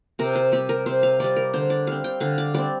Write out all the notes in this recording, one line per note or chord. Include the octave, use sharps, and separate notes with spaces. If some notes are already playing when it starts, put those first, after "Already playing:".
C3 A#4
C5
G3 C4 G4
A#4
C3 C5
F5
G3 C4 D5
A#4
D3 C5
D5
G3 C4 F5
G5
D3 F5
D5
G3 C4 D5